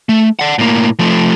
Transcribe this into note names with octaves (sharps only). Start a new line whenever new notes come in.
A3
D5 F#5
A2 A#3
F3 A3